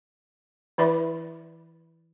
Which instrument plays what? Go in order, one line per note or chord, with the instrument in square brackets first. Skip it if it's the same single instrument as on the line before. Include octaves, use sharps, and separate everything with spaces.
[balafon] E3 E4 B4 D5 E5 B5